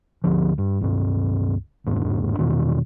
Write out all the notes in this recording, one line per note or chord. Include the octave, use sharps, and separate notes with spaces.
D2 F3
G2
C#2 G2
G1 E2 G#2 D4
E2 B2 D#3